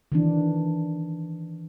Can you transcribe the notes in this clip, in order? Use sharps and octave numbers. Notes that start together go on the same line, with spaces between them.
D#3 E3 D4